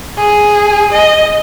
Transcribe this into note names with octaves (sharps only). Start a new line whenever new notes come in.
G#4
D#5